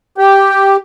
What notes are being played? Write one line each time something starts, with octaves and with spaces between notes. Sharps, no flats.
G4 G5